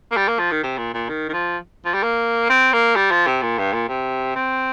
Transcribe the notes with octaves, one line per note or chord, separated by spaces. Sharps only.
A#3
G3
A#3
F3
D#3
C3
A#2
A#2
D#3
D#3
F3
F3
G3
A#3
C4
A#3
G3
F3
C3
A#2
G2
A#2
C3
C4